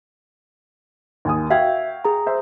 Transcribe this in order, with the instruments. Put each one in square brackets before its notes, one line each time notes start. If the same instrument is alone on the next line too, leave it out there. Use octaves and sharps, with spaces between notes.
[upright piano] D#2 G#5 D#6
[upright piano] F#4 F5 G5 [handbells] E5 G#6
[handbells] G#4 A#5
[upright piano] C5 E5